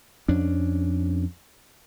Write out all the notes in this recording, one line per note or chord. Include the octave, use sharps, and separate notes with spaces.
F2 C#4 D4